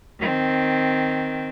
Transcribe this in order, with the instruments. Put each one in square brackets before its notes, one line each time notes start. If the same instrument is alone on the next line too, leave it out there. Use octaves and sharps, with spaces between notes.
[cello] D#3 C4